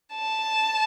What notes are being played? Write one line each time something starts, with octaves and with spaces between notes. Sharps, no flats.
A5